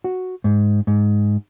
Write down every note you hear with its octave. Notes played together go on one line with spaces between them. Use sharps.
F#4
G#2
G#2